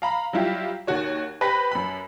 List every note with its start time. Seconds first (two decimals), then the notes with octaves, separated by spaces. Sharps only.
0.02 F5 A#5 B5
0.33 F#3 G3 E4 F4 G4
0.87 D#2 D#3 F#4 C#5
1.41 G4 B4 C5 F#6 A#6 B6
1.71 F#2 B5